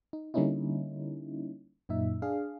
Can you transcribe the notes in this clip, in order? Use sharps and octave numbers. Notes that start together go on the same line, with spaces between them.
D#4
D3 G3 A#3 C#4 D#4 E4
F#2 A#2 D#4 E5
D4 G#4 F5